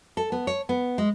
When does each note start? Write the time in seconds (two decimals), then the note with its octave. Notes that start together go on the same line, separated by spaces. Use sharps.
0.17 A4
0.32 B3
0.47 C#5
0.69 B3
0.98 G#3